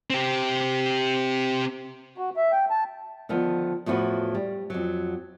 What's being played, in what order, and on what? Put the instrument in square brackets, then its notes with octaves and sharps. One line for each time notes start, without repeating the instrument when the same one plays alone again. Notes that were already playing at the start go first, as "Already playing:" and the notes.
[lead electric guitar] C4 G4
[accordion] F#4
E5
G5
A5
[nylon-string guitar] D3 D#3 F3 B3
E2 A2 F3 F4 F#4 B4
G3
F2 F#3